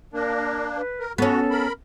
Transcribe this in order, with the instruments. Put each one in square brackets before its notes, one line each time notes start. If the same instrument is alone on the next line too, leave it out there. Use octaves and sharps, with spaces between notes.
[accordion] A#3 D4 [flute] A#4
[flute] B4
[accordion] A#4
[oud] B3 C#4 [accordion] F#4 [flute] A4
[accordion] A#4 B5